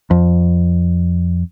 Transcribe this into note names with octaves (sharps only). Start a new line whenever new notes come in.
F2